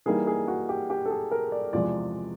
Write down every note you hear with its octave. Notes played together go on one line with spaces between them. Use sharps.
E3 G3 A#3 D#4 G#4
G#4
F#4
G4
G4
A4
G#4
A#4
D5
E2 C3 F3 G#3 D5